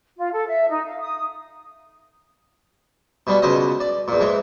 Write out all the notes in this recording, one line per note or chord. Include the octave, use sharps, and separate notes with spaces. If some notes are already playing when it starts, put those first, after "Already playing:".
F4
A4
E5
D#4
F5
D#6
B2 G3 B3
C#2 B2 C5 D#5
D5
E2 A#2
G#2 E3 G#3